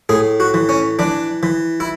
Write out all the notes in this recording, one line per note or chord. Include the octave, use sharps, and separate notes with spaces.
A2 G#4
F#4
E3
C#4
E3 D4
E3
E4